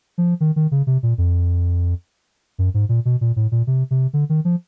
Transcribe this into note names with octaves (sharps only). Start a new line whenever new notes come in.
F3
D#3
D#3
C#3
C3
A#2
F2
F#2
G#2
A#2
B2
A#2
A2
A#2
C3
C3
D3
D#3
F3